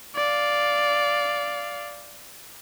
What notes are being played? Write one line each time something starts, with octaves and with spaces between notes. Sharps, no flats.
D5 F5